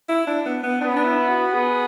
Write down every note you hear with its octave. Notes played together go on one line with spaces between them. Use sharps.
E4
D4
B3
B3
B3 D4
C#4
D4
E4
F#4
B3 G#4